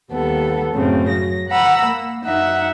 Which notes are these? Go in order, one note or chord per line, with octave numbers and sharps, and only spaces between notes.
D#2 G3 B3 A4
F#2 A2 C#3 A3 C4
F#3 A#6
F#5 A#5 B5 E6
A#3
F#2 D#4 E5 F#5